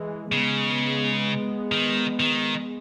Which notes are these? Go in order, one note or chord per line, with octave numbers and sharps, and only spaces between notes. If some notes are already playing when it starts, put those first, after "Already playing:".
Already playing: E3 G#3
C#3 G#3 B3
D#3
D#3